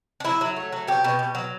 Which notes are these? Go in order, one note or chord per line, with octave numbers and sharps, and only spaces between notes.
D4
F#3 E4
F#3
A3
F#3
B2 G4
B2
B2
F#3